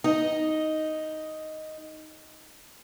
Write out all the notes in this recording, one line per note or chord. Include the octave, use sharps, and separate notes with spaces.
D#4 D#5